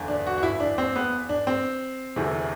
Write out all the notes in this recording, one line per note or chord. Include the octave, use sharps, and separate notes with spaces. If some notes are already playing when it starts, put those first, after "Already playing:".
Already playing: F#1 E2 D3
D4
F#4
F#4
E4
D4
C4
B3
D4
C4
E1 D2 C3 E3